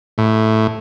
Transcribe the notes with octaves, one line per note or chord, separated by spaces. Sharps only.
A2